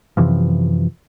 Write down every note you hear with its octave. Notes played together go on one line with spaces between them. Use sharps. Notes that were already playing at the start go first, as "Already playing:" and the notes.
F#2 C3 E3 F3